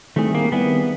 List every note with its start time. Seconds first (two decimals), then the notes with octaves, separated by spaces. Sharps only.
0.16 D#3 G3 A3 C4 E4 G#4
0.35 A#3
0.52 D#3 G3 B3 C4 E4 G#4